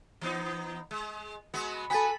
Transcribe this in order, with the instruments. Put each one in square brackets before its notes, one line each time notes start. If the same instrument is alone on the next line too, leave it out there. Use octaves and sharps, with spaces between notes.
[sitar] E3 B3 D#4
G#3
G#3 B3 F#4
[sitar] B3 F#4 [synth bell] A4 B5 [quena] G#5